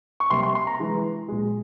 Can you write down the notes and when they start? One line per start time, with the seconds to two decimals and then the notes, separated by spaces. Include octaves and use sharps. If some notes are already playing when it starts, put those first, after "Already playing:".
0.20 C#6
0.30 C3 G3 A#3 C6
0.43 C6
0.55 C6
0.67 A#5
0.79 E3 G#3
1.28 A#2 G#3